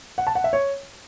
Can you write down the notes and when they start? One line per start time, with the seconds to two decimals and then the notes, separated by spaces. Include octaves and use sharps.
0.18 F#5
0.27 A5
0.35 F#5
0.44 E5
0.53 C#5